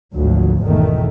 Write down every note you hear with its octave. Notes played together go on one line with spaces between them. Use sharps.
G#1 D2 F3 F#3
G#1 E2 B2 D#3 A3